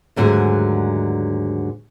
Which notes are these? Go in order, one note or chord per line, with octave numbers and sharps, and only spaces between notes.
D#2 G#2 D3 F#3 A3 G#4